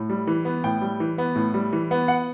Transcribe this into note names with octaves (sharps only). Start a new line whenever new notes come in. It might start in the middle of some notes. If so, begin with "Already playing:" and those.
Already playing: A2
G3
E3
B3
A2 G5
G3
E3
B3
A2
G3
E3
B3
F#5